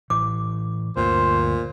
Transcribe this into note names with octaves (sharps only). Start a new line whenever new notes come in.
A2 E3 D6
D2 G2 A#2 D3 C5